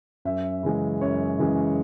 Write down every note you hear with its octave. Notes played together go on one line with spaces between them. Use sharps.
F#2 E5
C#3 E3 G#3
F#2 C#5
C#3 E3 G#3